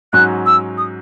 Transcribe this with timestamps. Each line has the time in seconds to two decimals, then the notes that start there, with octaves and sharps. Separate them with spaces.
0.13 G#2 F#3 C#4 F#4 F#6
0.46 E6
0.77 D#6